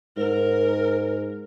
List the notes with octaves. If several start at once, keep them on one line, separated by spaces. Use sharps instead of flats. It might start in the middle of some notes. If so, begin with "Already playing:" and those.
G#2 A#4